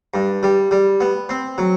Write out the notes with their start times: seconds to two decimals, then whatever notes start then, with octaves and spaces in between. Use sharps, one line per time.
0.14 G2
0.43 G3
0.71 G3
1.00 B3
1.29 C4
1.58 F#3